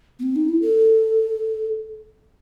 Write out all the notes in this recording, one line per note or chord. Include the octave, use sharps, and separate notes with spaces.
B3
C4
D#4
E4
A4